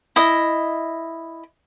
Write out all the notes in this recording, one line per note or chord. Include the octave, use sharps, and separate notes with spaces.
E4 D#5